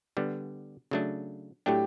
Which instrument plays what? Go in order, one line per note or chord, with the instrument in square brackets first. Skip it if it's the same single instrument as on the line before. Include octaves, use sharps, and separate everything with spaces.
[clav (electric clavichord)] D3 G3 B3
C#3 F#3 A3 D4
[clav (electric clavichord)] A2 F#3 A3 D4 [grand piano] G4